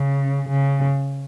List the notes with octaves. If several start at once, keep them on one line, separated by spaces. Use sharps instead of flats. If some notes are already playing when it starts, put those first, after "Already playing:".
Already playing: C#3
C#3